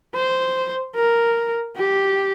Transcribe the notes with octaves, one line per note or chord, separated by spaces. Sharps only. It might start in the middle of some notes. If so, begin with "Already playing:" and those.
C5
A#4
G4